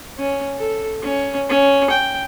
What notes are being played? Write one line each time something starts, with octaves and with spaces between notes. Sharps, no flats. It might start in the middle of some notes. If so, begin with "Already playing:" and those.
C#4
A4
C#4
C#4
G5